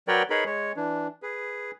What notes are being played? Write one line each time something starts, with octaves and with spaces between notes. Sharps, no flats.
F#3 A#4 B4 C#5 D5 G5
D#4 G#4 A#4 B4 C#5 B5
G#3 C#5
E3 D4
G#4 B4